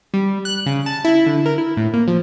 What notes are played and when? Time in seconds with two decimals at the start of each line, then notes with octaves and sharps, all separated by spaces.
0.14 G3
0.45 F#6
0.66 C#3
0.86 A5
1.05 E4
1.26 D3
1.46 A#4
1.58 E4
1.77 A2
1.94 A#3
2.08 F3